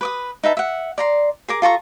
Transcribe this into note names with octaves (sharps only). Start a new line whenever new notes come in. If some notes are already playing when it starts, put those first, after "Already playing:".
B4 D6 D#6
D#4 B4 E5 A5
E5 F#5
D5 A#5 C6
G#4 A#4 D6
F4 A4 A#5 C#6